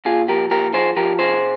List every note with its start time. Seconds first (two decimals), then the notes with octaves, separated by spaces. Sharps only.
0.05 A#2 F4 G#4
0.28 F3 G4 A#4
0.51 A#2 G4 A#4
0.74 F3 G#4 C5
0.96 F3 G4 A#4
1.19 C3 G#4 C5